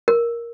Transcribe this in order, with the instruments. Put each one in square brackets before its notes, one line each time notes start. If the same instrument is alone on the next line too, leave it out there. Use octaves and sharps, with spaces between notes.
[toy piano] A#4